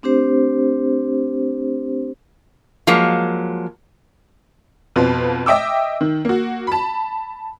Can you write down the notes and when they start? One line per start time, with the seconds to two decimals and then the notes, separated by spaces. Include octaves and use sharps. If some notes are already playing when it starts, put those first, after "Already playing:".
0.03 A3 C4 D4 G4 C5
2.87 F3 F#3 G#3 A#3
4.96 F2 B2 F4 B4
5.46 D#5 E5 G5 D6 E6
6.01 D#3
6.25 A#3 F#4
6.67 A5 B5